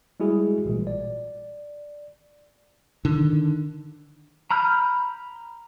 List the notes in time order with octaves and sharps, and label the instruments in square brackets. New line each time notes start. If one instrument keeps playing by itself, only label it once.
[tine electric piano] G3 G#3 E4 F#4 G#4
A1 A#2
D5
[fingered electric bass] D3 D#3
[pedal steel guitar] A#5 B5 F6 G6